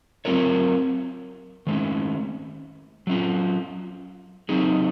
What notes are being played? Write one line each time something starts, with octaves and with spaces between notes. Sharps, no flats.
F#3 C4 F4 A#4 C#5
D#3 G#3 C#4
F#3 C#4 F4
F#3 C4 D#4 G#4